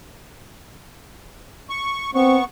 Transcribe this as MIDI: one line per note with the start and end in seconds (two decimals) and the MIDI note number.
1.70 2.10 85
2.15 2.44 59
2.15 2.37 60
2.15 2.44 85